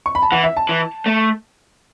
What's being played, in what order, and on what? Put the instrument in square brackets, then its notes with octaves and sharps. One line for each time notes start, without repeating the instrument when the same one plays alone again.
[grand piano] C#6
B5
A5
[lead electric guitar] E3 [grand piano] F#5
[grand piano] E5
A5
[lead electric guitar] E3
A3